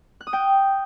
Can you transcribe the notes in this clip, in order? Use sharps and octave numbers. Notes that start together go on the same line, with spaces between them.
F#6
D#6
G5